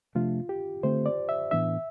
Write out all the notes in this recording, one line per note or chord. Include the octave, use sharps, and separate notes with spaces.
C3 F3 A3 D4 F4
G4
D3 A3 C4 C5
D5
E5
A2 E3 B3 D4 E5